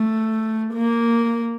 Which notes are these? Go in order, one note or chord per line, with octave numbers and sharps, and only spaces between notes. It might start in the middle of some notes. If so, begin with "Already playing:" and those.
Already playing: A3
A#3